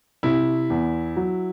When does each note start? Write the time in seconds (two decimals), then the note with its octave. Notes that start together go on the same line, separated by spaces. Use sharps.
0.23 C3 E4
0.70 E2
1.16 F#3